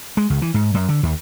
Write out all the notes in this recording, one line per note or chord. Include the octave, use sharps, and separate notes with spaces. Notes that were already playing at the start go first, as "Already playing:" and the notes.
G#3
C#2
E3
G#2
F#2
D3
D#2